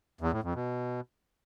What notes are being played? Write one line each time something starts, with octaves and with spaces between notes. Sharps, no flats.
E2
A2
F2
B2